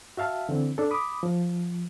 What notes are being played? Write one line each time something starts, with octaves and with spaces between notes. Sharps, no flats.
F#4 E5 F5 A5
D3 E3 C4
D4 A4
B5 D6 D#6
F3